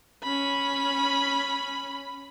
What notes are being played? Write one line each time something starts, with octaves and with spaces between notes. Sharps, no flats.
C#4 B5